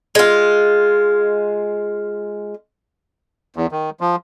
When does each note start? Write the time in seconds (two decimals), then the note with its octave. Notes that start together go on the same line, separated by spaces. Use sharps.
0.15 G#3 F4
3.56 E2
3.72 D#3
4.00 F3